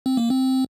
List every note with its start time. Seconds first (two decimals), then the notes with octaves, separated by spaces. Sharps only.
0.06 C4
0.17 A#3
0.30 C4